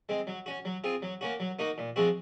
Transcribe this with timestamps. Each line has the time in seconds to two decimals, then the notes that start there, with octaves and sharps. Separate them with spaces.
0.09 G#3 C4
0.27 F#3
0.46 C#4 F#4
0.65 F#3
0.84 C4 F4 G#4
1.02 F#3
1.21 A#3 C#4 F#4
1.40 F#3
1.59 A#3 D#4 F#4
1.78 A#2
1.96 F3 G#3 C4 F#4